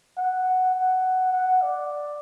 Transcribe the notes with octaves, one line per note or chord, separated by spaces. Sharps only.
F#5
F#5
F#5
D5